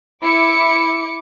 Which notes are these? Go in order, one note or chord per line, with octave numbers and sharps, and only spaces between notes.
E4 D6 C#7